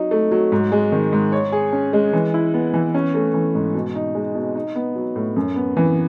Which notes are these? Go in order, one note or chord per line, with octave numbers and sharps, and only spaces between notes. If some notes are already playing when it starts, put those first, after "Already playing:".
Already playing: F#3 D#4
A3
F#3
G#2
G#3
D#3
G#2
C#5
G#4
C#4
G#3
E3
E4
B3
E3
C#4
A3
E3
G#2
B2
D#4
G#3
B2
D#4
B3
F#3
A2
F#2
B3
E3